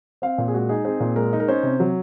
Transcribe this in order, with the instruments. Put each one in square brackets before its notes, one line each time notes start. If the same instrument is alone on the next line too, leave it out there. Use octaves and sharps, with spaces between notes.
[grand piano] C4 F5
A#2
G#4
G#3 F#4
D#4 G#4
C4 G#4
A#2
G#3 A#4
D#4
A#4
C#4 C5
C3
F#3